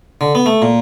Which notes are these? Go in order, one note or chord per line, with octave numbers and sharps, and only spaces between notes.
D3
B3
A3
A#2